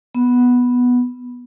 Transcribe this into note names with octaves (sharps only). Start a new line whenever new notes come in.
B3